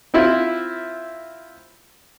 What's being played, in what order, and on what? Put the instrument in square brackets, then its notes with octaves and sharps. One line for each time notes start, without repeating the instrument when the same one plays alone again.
[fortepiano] C4 E4 F4